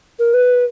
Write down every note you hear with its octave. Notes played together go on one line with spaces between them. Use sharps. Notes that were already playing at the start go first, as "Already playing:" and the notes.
A#4
B4